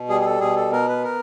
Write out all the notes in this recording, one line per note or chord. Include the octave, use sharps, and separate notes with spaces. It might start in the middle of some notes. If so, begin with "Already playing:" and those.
Already playing: B2
G3 G#4
G#4
A4
B2 G#4
A4
B3 A#4
B4
A#4